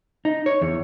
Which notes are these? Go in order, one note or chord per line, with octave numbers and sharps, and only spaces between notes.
D#4
C#5
E2